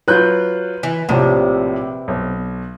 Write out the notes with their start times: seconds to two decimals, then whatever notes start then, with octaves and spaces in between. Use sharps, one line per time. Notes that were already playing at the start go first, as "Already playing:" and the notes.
0.08 F#3 F4 B4 F#6 G6
0.83 E3
1.09 A#1 A2 C3 F3
2.08 B1